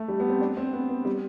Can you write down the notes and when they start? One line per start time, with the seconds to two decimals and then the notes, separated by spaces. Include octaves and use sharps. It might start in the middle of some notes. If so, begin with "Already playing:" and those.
Already playing: A3
0.08 G3
0.20 B3
0.30 C4
0.41 D4
0.57 C4
0.73 B3
0.89 B3
1.05 G3